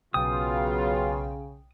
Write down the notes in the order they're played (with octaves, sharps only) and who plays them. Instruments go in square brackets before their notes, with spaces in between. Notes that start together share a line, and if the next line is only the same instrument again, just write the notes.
[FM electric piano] B1 G5 [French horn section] C#3 [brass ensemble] F#3 B3 F4 [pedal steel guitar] D#6